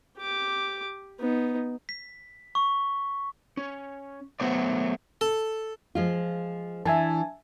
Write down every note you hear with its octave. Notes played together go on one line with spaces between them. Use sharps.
G4 D6
B3 D#4
B6
C#6
C#4
F#3 A3 B3 C5 D5
A4
F3 G#3 F4
E3 D4 E4 E5 G#5 A5